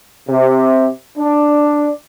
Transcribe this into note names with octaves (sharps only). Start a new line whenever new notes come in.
C3
D4